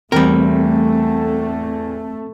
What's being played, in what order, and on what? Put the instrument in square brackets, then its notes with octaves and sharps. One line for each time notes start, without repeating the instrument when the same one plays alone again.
[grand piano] E2 G5 [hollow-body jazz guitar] G3 A#4 [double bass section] A3 [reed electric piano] C4